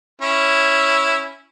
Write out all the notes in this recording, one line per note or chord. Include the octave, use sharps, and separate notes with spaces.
C#4 E4